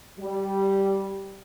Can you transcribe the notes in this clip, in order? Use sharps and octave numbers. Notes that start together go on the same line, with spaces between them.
G3